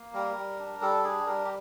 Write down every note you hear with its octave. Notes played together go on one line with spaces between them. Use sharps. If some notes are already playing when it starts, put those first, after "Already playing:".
Already playing: A#3
G3 A#4
G3
D4
G3 A4
D4 G#4
G3 A#4
G4